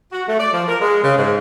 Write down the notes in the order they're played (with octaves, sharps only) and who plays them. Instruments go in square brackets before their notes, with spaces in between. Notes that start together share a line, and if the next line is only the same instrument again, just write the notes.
[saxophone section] F#4
A3
D5
F3
A#4
G#3
C#3
G#2